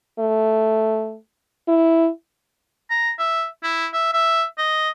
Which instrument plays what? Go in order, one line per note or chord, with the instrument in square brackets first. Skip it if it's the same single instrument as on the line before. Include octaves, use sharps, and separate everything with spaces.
[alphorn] A3
E4
[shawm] A#5
E5
E4
E5
E5
D#5